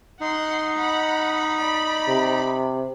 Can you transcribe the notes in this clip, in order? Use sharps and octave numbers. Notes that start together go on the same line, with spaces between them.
D#4 F#5 C6
F#5 B5
D5 B5
C3